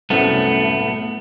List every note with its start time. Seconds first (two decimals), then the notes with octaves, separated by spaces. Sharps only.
0.10 C2 F#2 A2 A3 B3